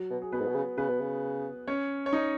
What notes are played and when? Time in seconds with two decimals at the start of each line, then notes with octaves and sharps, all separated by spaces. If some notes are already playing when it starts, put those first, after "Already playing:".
Already playing: F#3 F#4
0.10 B2
0.22 G#4
0.32 B2 B3 B4
0.40 G#2
0.47 B2
0.55 C#3
0.78 C#3 B3 B4
0.89 B2
1.00 C#3
1.67 C#4 C#5
2.06 C#5
2.13 D#4 D#5